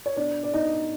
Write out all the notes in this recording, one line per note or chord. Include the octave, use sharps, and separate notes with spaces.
C#5
B2 D4 D5
D5
B2 D#4 D#5